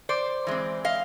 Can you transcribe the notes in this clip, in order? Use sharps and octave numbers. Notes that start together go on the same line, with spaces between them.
C5 D5
E3 G#3 C4
D#5 F5